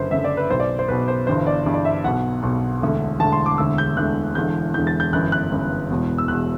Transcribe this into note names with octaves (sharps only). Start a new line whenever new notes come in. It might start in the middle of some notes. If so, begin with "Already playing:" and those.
Already playing: F#1 F#2 D3 B4 C5
F#1 F#2 D3 E5
D5
B4
B1 B2 C5
D5
C5
B1 B2 B4
C5
G1 G2 E3 C5
D5
G1 G2 E3
D5
E5
B1 B2 F#5
B1 B2
E1 D2 D3
E1 D2 D3 A5
C6
D6
E1 D2 D3 E6
G6
E1 D2 D3 F#6
E1 E2 D3 G6
E1 E2 D3 G6
A6
G6
G1 F#2 E3 F#6
F#6
G1 F#2 E3
E1 E2 B2
E6
E1 E2 B2 F#6